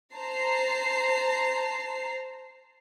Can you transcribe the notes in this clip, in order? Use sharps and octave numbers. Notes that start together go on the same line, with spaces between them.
C5 A5 A#5 C7